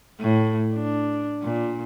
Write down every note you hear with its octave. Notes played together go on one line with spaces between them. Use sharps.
A2
D4
A#2